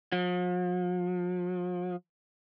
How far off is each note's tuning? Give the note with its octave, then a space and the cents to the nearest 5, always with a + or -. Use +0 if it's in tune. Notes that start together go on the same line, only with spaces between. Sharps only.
F3 +45